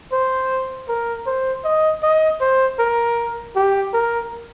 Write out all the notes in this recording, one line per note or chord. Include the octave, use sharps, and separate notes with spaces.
C5
A#4
C5
D#5
D#5
C5
A#4
G4
A#4